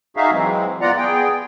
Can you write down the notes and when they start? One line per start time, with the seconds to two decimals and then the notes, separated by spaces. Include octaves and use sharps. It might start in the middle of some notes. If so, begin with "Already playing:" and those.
0.17 D#4 F#4 G#4 E5 F5
0.32 E3 F#3 G#3 C4
0.81 B3 F4 D5 F#5 A#5
0.98 B3 G#4 G5